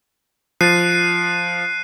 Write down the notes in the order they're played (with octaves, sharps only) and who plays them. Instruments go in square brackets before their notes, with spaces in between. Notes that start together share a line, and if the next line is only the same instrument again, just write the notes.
[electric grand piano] F3 A6 [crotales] F#6 C7 D#7